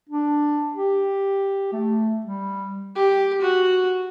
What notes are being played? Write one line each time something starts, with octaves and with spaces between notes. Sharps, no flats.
D4
G4
A3
G3
G4
F#4